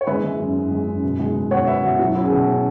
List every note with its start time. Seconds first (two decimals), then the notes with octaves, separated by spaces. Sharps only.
0.01 C#5
0.07 G#3 B4 E5
0.24 G#3
0.40 F#2
0.56 F#2
0.71 G#3
0.87 F#2
1.04 B2
1.19 G#3
1.36 B2
1.51 G#3 C#5 F#5
1.67 B2 B4 E5
1.83 B2 F#4
1.99 F#3 F#4
2.15 C#4 E4
2.24 G#4
2.31 B2 F#4
2.47 C#4